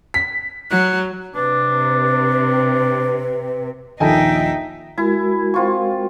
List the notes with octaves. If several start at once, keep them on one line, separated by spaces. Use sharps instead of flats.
B6
F#3 F#6
C3 D4 B4
A#1 D#2 D#4 A4 D#5 E5 G5 G#5
G#3 E4 F#4 A#4
C4 F4 C#6